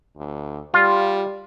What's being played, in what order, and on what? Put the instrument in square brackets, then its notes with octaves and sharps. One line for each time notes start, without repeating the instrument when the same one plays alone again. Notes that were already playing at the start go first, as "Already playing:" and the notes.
[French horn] D2
[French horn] G3 [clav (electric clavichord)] F4